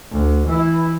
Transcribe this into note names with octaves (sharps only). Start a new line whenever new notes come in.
D2
E3 E4